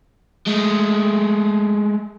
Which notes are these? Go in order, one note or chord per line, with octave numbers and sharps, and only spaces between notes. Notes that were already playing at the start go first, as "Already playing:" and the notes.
G#3 A3